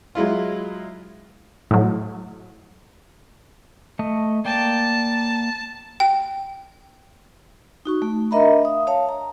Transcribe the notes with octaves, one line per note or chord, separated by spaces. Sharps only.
F#3 G#3 E4 F4
A2 F#3
A3 D#5
A#3 D5 G5 A5
G5
D#4 F#4 C#6
A3
D4 A#4 D#5 E5 A#5 B5
E5 F5 D#6
C#5 F5 A5
A#5